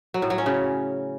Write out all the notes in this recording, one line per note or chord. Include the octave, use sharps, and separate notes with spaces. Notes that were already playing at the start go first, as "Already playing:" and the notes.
F#3
A2
F#3
C#4
C#3